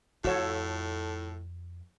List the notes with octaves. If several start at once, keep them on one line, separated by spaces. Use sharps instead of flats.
F2 A2 F4 F#4 A4 C#5 E5